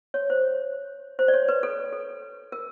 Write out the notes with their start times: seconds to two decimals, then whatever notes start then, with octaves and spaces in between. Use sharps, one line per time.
0.14 C#5
0.30 C5
1.19 C5
1.28 D5
1.34 C#5
1.49 B4
1.63 A4
1.93 A4
2.52 A#4